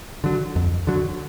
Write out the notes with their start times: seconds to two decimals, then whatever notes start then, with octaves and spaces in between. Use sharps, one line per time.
0.24 D3 F#3
0.56 F2
0.87 D3 F#3